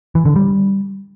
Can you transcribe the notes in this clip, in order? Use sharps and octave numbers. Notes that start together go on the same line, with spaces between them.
E3
D3
G3